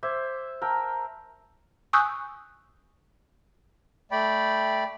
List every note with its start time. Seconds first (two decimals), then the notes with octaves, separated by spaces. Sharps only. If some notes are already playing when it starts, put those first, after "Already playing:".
0.03 C5 E5 D6 G#6
0.62 A#4 G5 A5 A#5 E6
1.93 G#5 C#6 D#6 E6 F#6 G6
4.12 A3 D5 G5 B5